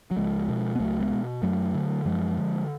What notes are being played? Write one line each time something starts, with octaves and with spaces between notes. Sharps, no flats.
F#3
C#2 F3 G#3
B2
B3
C#2 F#3 A3
G#3 B3
B2
F#2 F#3 A3
D3
F#2 F3 G#3
D3